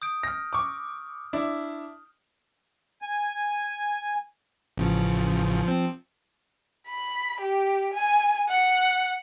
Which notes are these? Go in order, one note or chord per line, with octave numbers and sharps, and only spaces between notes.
D#6 G6 D7
F6 G6 A#6
C#6 D6
D4 E4
G#5
A1 C#3 F3
F3 C4
B5
G4
G#5
F#5